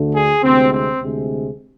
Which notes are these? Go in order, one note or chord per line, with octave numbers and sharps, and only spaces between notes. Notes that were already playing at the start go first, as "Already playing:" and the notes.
Already playing: D2 D3 A3
G#4
D2 C3 G#3 C4
C4
D2 C3 G#3